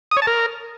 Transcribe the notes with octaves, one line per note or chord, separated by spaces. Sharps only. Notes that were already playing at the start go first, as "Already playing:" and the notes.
D#6
C#5
A5
A#4